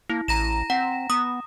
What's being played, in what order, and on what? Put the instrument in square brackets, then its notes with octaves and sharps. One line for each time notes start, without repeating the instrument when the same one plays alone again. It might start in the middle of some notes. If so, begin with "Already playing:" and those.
[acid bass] A#3 [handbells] E4
[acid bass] A1 [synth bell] A#5 A#6 E7
[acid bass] C4 [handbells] F#5
[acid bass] B3 [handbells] D#6